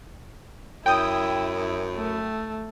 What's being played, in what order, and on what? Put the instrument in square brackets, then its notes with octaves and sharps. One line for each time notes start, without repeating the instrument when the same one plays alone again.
[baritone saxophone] F#2 [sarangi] E4 [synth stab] G5 D#6
[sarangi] A3